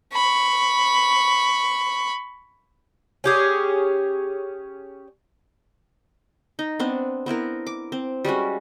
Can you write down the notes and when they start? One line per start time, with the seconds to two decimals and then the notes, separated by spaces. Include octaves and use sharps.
0.13 B5 C#6
3.24 C#4 G4 G#4
6.59 D#4
6.79 B3 C4 D4
7.26 B3 C4 E4 A#4
7.67 D6
7.92 C4
8.25 G3 G#3 C#4 F#4